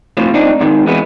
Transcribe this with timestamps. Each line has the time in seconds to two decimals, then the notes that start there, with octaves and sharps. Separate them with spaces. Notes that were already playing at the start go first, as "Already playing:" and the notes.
0.17 A2 C3 F3
0.34 C#2 C4 D4 D#4
0.61 G#2 C3 D#3
0.86 E3 G#3 B3